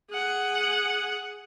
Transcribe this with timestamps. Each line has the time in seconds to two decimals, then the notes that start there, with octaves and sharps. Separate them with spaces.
0.11 G#4 F#5